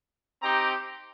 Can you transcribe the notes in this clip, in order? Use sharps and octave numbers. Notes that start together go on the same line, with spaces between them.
C4 D#4 G4 A#5 D6